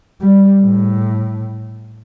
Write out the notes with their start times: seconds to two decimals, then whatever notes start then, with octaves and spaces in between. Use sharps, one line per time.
0.21 G3
0.61 A2